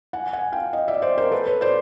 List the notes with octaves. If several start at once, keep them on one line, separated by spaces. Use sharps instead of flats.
F#5 G#5
F#5 G#5
F5 G5
D#5 F5
D5 E5
C5 D5
A#4 C5
A4 B4
B4 C#5
C5 D5